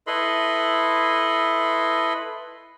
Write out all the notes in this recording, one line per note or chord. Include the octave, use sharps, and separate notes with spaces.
E4 A4 B4 D#5 B5 C6